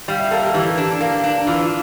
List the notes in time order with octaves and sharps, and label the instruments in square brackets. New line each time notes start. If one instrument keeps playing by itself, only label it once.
[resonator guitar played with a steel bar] G3 [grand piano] F5
[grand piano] E5
[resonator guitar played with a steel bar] A#3 [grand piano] A4
[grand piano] G4
[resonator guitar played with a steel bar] E3 [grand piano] G4
[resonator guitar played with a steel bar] D4
A#3
D4
[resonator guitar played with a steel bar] E3 [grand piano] F4